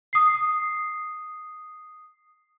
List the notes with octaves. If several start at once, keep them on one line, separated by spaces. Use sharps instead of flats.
D#6 C7